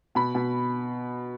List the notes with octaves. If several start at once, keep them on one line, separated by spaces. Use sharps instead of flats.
B2 B5
B2